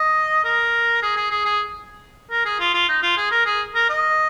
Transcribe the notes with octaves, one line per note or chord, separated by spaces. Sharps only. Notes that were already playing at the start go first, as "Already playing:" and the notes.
Already playing: D#5
A#4
G#4
G#4
G#4
G#4
A#4
G#4
F4
F4
D#4
F4
G#4
A#4
G#4
A#4
D#5